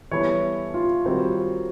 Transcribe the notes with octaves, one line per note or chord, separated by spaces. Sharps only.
E3 G3 B3 E4 A4 C#5
F4
D#3 G3 C4 F4 F#4